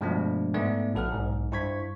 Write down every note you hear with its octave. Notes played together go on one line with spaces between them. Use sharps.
G2 B2 F3 G#3 A3 D4
G#2 A3 B3 D5
A#1 A2 A4 F#5 F6
B1 G#2
G2 E4 C5 C#6 G#6 B6